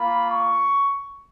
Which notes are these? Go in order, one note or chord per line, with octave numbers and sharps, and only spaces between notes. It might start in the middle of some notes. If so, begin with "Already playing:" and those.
Already playing: A#3 F4 B5
C#6